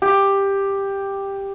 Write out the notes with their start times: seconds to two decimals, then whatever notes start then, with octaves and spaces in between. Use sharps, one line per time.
0.02 G4